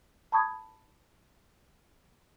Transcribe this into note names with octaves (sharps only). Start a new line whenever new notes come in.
A5 B5 C#6 D#6 G#6